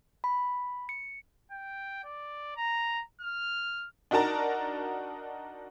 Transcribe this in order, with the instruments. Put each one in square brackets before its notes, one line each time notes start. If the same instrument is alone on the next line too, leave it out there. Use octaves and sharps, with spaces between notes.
[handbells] B5
C#7
[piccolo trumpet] G5
D5
A#5
F6
[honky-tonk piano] D4 D#4 F#4 A#4 A5 A#5